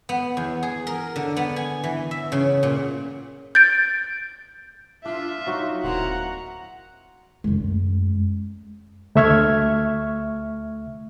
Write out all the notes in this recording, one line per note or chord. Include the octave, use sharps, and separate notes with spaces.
B3
E2
G#4
A#4
D3
B3
G#5
E3
E5
C#3
A#2
G6 A6 D7
D4 F4 E5
F#3 D#4 F#4
D#1 A#3 C4 E4 F#5 A#5
F#2 G#3
D2 A3 E5 C#6 F6 G#6